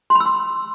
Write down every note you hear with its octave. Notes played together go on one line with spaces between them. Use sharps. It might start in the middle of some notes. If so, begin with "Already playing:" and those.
C6
B5
E6
C6